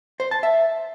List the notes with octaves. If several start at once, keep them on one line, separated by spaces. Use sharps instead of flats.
C5
A5
E5